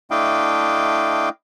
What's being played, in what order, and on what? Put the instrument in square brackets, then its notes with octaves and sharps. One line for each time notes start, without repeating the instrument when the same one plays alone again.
[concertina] A3 D4 E4 D#5 F5 G5